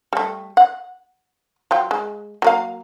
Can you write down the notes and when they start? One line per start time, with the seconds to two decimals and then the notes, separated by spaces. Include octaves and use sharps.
0.13 G3 A3
0.57 F#5
1.71 F#3 F4 G5
1.91 G#3
2.42 F#3 A#3 F5